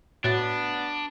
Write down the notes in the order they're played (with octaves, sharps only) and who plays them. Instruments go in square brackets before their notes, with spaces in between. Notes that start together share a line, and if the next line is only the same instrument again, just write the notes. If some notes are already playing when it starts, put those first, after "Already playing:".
[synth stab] A2 [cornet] B3 [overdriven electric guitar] D4 [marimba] F#4 C#5 A6